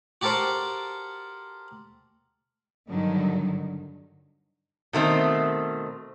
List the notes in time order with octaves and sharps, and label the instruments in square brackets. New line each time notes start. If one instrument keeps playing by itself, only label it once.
[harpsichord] F#4 G4 A4 A#4 C5
[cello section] G2 D3 D#3 F#3
[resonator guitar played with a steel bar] B2 D#3 A3 C4